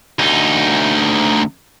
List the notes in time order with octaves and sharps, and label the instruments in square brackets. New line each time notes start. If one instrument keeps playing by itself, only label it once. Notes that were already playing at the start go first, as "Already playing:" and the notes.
[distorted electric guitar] D2 D#4